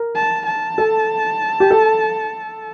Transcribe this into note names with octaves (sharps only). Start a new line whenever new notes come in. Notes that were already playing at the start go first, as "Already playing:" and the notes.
Already playing: A#4
A5
A5
A4
G4
A4